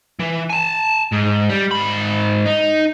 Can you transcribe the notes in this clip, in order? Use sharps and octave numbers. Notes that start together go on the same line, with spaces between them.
E3
G#5 A5
G#2
G3
G#2 B5
D#4